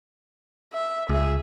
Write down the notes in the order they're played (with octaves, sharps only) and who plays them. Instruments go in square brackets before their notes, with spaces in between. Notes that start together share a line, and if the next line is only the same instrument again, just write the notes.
[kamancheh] E5
[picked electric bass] C#2 [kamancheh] G#4 E5